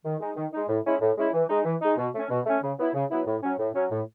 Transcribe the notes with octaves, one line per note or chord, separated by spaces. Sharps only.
D#3
G#3 D#4
D#3
G#3 D#4
A2
G#3 C#4 E4
A2
G#3 C#4 E4
E3
G#3 D#4
E3
G#3 D#4
B2
A3 C#4
B2
A3 C#4
C#3
F#3 B3 E4
C#3
F#3 B3 E4
A2
F#3 C#4
A2
F#3 C#4
A2